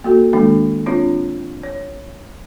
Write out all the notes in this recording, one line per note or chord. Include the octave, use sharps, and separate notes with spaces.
A#3 F#4 A4
D#3 G#3 A#3 D4 A4
C4 D4 F4 C#5
C#5